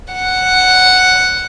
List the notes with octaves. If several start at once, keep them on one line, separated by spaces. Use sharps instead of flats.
F#5